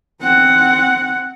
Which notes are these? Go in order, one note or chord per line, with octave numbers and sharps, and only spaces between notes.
C4 F#5